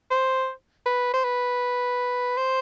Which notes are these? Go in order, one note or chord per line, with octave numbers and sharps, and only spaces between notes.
C5
B4
C5
B4
C5